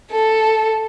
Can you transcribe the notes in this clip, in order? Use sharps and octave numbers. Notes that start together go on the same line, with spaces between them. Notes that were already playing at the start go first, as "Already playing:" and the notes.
A4